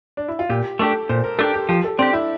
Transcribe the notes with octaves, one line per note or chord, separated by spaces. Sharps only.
D4
E4
F4
A#2 G4
A3 D4 G4 A4
A#2 C5
A#4
A3 D4 G4 A4
G4
F3 G4
A4
C4 D4 G4
E4